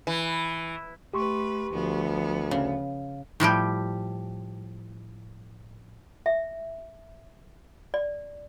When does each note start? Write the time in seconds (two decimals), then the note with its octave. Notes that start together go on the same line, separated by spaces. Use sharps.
0.07 E3
1.14 A3 G4 B4 C6 C#6
1.73 D2 F3 B3
2.51 C#3 F5
3.40 A2 F3 G3 G4
6.26 E5
7.94 D5